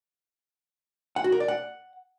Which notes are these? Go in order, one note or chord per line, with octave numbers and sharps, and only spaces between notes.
F#5
F#4
A#4
D5
F#5